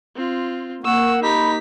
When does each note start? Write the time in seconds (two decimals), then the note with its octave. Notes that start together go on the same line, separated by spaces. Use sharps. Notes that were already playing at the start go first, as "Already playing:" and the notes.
0.16 C4 F4
0.84 A#3 F#5 C#6 E6
1.22 D#4 G4 B5 B6